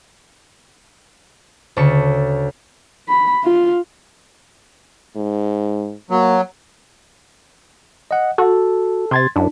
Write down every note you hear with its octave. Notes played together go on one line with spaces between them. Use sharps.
D2 C#3 A4 C#6 C#7
B5
F4
G#2
F#3 A#3
D#5 F#5
F#4 A4
C3 C6 G#6 A6
F#2 D4 E4